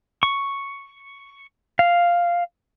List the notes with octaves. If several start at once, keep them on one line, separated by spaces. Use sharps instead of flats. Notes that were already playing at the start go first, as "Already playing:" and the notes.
C#6
F5